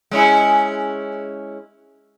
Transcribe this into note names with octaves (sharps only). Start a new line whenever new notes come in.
G#3 C#4 E4